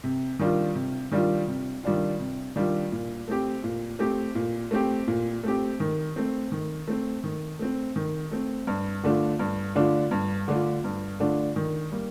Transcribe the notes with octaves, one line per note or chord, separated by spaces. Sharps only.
C3
D#3 G3 D4 F4
C3
D#3 G3 D4 F4
C3
D#3 G3 D4 F4
C3
D#3 G3 D4 F4
A#2
A3 C4 G4
A#2
A3 C4 G4
A#2
A3 C4 G4
A#2
A3 C4 G4
D#3
A3 C4
D#3
A3 C4
D#3
A3 C4
D#3
A3 C4
G2
D3 A3 D4 F4
G2
D3 A3 D4 F4
G2
D3 A3 D4 F4
G2
D3 A3 D4 F4
D#3
G3 A#3